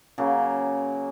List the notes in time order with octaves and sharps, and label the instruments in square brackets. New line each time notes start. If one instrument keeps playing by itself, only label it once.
[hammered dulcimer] C#3 F#3 A#3